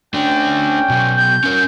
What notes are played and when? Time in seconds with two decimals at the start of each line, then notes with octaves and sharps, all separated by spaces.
0.14 A3 C#4 D4 D5 G5
0.89 B2 F#3
1.17 G6
1.44 C#4 A#4 C#5